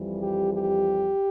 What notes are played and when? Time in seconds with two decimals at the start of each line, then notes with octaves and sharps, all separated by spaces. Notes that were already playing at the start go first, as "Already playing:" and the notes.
Already playing: F2 E3 G3
0.20 G4
0.52 G4